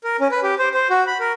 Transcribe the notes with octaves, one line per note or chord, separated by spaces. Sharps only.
A#4
C#4
B4
G4
C5
C5
F#4
B5
A#4